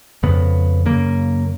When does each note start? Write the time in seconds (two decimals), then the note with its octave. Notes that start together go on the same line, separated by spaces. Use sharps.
0.23 F2 C#3 B3
0.86 F#2 C#3 A#3